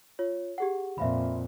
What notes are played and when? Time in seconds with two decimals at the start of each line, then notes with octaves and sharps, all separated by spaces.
0.19 F4 C#5
0.58 G4 G#4 F#5
0.98 F2 A#2 E5 F5 B5